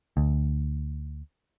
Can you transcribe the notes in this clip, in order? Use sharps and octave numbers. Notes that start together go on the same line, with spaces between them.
D2